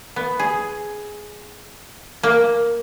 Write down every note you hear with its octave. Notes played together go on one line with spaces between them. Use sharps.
B3
G#4
A#3